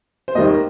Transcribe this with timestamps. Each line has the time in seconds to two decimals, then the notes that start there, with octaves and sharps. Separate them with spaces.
0.28 C5
0.35 D#2 D#3 G3 A#3 D#5